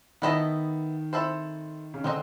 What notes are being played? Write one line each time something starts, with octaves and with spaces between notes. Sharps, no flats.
D#3 B3 E4 A4 C5 D#5
C4 E4 A4 C5
C#3
D3 G#3 C4 D#4